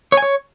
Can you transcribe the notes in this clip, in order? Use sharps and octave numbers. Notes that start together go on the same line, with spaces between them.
C#5
G#5
C#5